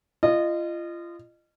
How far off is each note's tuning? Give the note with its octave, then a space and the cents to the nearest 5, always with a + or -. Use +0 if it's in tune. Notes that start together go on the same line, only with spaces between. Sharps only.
F4 -30 D#5 -25